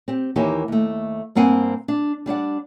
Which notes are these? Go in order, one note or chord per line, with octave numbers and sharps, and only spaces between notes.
C4 G4
D#2 E3 A#3 D#4 G4 C#5
D#2 A3
G2 A#3 C4 F#5 G#5
D4
G3 D4 D5 F#5